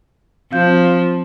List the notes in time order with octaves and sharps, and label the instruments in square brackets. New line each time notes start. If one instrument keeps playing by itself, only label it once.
[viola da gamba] F3 [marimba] C4 F5 G6